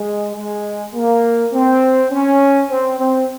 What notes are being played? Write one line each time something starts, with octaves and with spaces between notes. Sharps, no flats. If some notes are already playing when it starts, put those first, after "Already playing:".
Already playing: G#3
G#3
A#3
C4
C#4
C4
C4